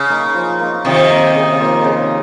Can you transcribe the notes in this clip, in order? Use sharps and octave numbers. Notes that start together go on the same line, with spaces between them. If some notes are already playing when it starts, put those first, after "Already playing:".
Already playing: C#3
A#3 D#4
F3
A#3 D#4
C3 D#3 F3
A#3 D#4
C#3
F3 A#3 D#4
C#3